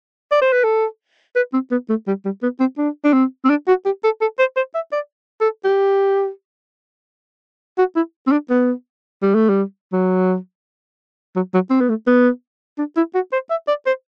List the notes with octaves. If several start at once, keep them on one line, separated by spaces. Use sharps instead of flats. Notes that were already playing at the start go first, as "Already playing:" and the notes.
D5
C5
B4
A4
B4
C4
B3
A3
G3
G3
B3
C4
D4
D4
C4
C4
D4
F#4
G4
A4
A4
C5
C5
E5
D5
A4
G4
F#4
E4
C4
D4
B3
G3
A3
G3
F#3
F#3
F#3
C4
B3
A3
B3
D4
E4
F#4
C5
E5
D5
C5